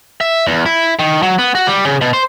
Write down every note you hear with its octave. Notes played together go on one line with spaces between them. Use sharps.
E5
E2
E4
D#3
F#3
B3
F#4
G3
C#3
B2
C5